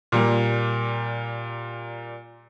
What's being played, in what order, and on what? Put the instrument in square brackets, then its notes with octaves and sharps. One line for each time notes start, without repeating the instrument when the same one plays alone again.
[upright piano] A#2 G3 A#3